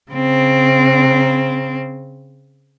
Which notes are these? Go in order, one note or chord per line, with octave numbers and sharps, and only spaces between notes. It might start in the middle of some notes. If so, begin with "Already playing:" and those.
C#3 C4